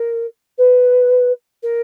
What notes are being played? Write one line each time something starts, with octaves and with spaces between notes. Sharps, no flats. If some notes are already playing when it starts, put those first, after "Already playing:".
Already playing: A#4
B4
A#4